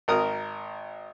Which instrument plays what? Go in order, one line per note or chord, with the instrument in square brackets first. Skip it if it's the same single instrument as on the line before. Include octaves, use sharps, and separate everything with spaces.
[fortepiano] G#1 A#4 D#6